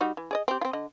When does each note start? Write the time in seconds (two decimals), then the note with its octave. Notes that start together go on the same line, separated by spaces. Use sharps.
0.01 G3 D#4 F#4
0.17 E3
0.31 G#4 D5 D#5
0.48 C4 G4
0.61 C4 F4
0.73 D3 D#5